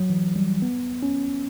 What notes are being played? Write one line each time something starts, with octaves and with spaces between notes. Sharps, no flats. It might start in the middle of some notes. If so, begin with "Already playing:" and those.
Already playing: F#3
E3
G3
B3
C#4